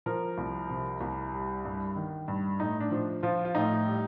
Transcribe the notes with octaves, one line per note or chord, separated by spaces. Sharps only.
F3 A#4
C2
C3
C2
G3
G2
D#3
G2
A2 D#4
D4
F3
F3 F4
F4
A2 D#4
G3